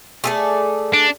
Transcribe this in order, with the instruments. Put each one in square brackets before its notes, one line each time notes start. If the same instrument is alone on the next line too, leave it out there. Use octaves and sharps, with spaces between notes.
[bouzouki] A3 G#4 D5
[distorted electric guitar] D4